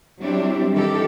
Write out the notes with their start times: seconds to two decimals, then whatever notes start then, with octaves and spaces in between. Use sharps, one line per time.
0.19 F#3 G3 C4 D4 E4 G4
0.71 D#3 E3 G4 A4